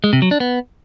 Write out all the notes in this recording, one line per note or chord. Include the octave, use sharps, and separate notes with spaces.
G#3
C3
F#3
D4
B3